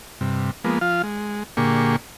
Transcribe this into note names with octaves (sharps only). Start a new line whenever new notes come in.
G2 C3
F3 G#3 A#3 B3
F3 F4 F5
G#3
A#2 D3 A#3 G4 G#4 C#6